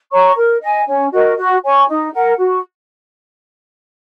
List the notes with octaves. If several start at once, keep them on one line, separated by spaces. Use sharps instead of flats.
C#5 A#5 C#6
A#4
D#5 G#5
C#4
F#4 A#4 D#5
F#4
C#5 G#5 C#6
D#4
A#4 F#5
F#4